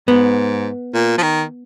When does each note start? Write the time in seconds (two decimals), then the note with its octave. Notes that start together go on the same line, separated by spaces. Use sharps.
0.08 G#2 B3
0.94 A#2
1.18 F3
1.23 D#3